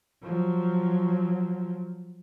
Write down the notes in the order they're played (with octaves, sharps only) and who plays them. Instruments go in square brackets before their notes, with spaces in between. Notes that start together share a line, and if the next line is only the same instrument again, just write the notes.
[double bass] F3 F#3